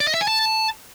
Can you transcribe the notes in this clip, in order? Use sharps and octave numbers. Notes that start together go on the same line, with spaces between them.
D5
D#5
E5
G#5
A5